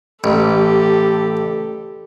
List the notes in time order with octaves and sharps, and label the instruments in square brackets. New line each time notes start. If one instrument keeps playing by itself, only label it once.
[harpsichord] A1 [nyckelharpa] G4 A4